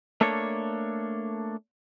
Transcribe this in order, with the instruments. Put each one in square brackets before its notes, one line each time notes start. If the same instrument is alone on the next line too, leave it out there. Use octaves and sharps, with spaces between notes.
[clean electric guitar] A3 A#3 D4 A4 C#5